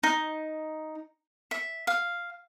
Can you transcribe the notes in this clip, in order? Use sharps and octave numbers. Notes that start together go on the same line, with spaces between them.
D#4
E5
F5